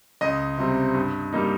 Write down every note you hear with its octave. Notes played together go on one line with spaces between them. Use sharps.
C#2 D#5
C3 G3 C4
G2
G3 A#3 D#4